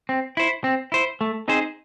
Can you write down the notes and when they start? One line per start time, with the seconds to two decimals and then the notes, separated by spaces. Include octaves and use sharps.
0.09 C4
0.37 E4 C5
0.64 C4
0.92 E4 C5
1.21 A3
1.48 C4 D#4 G#4 C5